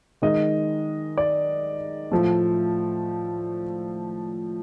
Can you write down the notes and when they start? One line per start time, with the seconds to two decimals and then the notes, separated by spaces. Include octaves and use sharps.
0.22 D#3 G#3 D#5
1.18 D5
2.11 A2 F3 A3